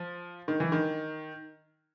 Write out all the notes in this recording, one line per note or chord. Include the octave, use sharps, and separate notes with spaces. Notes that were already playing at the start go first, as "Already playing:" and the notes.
Already playing: F3
D#3
E3
D#3